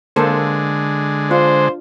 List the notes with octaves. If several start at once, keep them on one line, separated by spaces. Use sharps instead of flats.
D3 G#3 A#3 A4 C5
D4 F4 C5